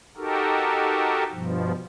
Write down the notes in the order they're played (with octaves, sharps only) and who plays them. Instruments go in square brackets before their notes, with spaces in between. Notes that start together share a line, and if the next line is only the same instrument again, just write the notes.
[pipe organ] D#4 F#4 G4 A4 A#4
G2 B2 F3